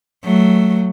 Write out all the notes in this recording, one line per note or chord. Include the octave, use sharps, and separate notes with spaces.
F#3 A3